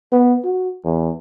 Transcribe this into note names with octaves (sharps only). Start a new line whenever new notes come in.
B3
F#4
E2